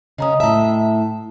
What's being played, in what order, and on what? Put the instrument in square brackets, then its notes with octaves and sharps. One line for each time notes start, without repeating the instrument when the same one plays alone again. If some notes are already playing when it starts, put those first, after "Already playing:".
[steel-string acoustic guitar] C#3 C#4 [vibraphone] D#5 A#5 D#6
[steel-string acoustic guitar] A2 E5 [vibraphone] A5